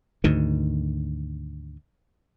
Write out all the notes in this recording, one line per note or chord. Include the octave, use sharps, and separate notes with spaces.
D2 G#2 D#3